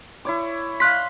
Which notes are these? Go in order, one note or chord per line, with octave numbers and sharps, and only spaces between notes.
E4 C#5 D6
F5 C6 F#6 B6